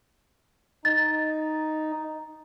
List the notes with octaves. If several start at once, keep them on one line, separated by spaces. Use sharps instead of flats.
D#4 A6